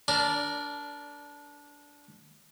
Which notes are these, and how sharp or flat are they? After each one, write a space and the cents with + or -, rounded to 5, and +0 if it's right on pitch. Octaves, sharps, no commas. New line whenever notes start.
D4 -15 A#4 +0 D5 +0